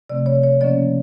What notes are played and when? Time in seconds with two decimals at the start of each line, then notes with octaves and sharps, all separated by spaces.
0.10 C3 F3 A3 C4 D5
0.26 C#5
0.43 C#5
0.60 C#3 F3 A#3 C#4 D5